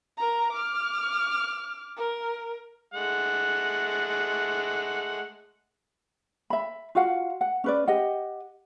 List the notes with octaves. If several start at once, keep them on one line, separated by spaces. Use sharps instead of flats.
A#4 A#5
D6 F6
A#4
G#3 A3 F#5
E5 B5
F4 F#4 F5 F#5
F#5
C#4 B4 D5
G4 D#5 F#5